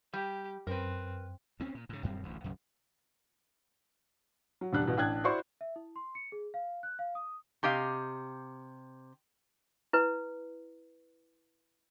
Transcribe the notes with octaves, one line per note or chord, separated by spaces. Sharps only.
G3 G4
F#2 C4 A#4 B4
D2 C4 C#4
A#2
G#2 C#3
D#1 F#2 G3 C4
D1 A1 D2
B1 F#2 C#3
F#3
E1 D3 G3 D4 F#6
G2 B2 E3
A1 D4 G5 F#6 G#6
E4 F#4 C5 D5 C6 C#6
E5
E4
C6
C#7
G#4
F5
F#6
F5
D#6
C3 G4 D#5 F5
E4 B4